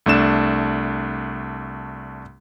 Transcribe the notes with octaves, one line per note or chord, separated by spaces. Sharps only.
C2 A3 D4 E7